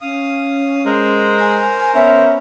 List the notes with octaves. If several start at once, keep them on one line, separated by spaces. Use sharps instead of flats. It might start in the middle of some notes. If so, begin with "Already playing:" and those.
C#4 F5 D#6
G#3 A#4 C5 A#5
G#5
B3 C#4 E5